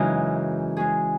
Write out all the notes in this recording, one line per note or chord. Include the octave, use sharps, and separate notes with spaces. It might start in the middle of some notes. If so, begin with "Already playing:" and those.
Already playing: F#2 C#3 E3 G#3 D#4
G#3 C#4 G#4